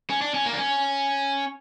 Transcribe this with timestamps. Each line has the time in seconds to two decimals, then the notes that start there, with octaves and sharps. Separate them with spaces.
0.10 C#4
0.21 D4
0.34 C#4
0.46 A#3
0.53 D4
0.58 C#4